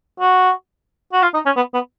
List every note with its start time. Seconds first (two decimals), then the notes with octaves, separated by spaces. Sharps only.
0.20 F#4
1.13 F#4
1.22 F4
1.34 D#4
1.46 C#4
1.56 B3
1.74 B3